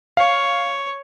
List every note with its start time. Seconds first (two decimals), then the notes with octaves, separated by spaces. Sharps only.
0.17 C#5 F5